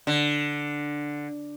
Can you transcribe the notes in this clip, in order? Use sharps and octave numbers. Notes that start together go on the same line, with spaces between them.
D3